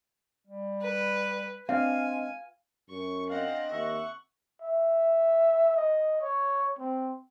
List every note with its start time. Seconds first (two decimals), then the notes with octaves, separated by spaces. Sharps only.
0.47 G3
0.82 B4
1.69 G#3 C4 D4 F5 G#5
2.90 F#2 C#6
3.30 C4 D4 D#5 F5 F#5
3.72 D#2 E5 F#5 C#6
4.62 E5
5.76 D#5
6.21 C#5
6.79 C4